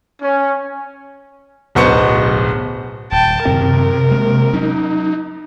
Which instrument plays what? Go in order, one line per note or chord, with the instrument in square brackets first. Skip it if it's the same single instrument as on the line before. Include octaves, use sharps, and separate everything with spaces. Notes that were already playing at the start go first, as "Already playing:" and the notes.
[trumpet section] C#4
[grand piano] D1 B1 B3 C5 C#6 C#7
[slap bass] D#1 [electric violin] G5 A5
[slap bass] F#2 D#3 C4 [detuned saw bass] C3 [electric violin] A#4
[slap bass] G#3 A#3
[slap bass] F#3 C#4 [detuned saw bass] D#4